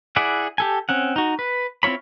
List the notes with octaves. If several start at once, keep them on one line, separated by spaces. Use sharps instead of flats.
E4 G#4 D5 E5 F#5
G4 A4 G#5
C4 C#4 F#5
D#4 F#4
B4
C4 E4 F4 C#5 B5